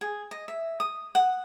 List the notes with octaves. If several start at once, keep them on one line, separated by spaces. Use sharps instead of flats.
G#4
D#5
E5
D#6
F#5